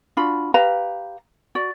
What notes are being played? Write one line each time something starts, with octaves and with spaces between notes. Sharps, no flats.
D4 F4 F#4 B5
G4 B4 F5 A#5
F#4 D5